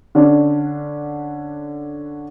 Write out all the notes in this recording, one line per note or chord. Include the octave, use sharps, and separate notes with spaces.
D3 C#4 D4